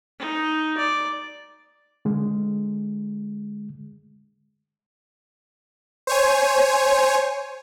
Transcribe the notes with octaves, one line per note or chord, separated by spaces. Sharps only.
D#4
D5
D3 G#3
C5 C#5 G#5